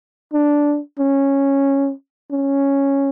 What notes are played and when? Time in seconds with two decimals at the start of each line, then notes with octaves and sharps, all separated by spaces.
0.33 D4
0.99 C#4
2.32 C#4